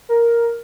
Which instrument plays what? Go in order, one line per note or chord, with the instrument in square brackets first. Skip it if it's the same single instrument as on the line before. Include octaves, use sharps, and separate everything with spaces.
[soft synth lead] A#4